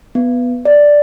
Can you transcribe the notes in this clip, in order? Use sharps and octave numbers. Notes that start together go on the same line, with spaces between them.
B3
D5